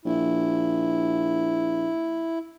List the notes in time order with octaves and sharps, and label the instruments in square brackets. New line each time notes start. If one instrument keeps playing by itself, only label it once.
[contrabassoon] A#1 [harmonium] E4